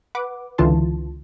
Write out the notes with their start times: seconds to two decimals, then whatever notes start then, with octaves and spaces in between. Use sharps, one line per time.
0.15 B4 F#5 D6
0.58 C#2 D3 E3 F4 A5 C6